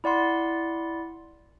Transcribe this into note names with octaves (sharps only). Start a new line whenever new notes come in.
E4 D5 F#5 C6